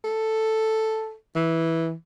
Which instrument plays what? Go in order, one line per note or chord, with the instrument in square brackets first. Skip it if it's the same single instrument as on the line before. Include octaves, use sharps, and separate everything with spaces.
[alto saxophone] A4
E3